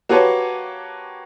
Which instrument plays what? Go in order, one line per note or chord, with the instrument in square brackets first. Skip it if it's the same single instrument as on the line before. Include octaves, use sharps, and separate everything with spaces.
[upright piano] A#3 F#4 G4 B4 C#5 A5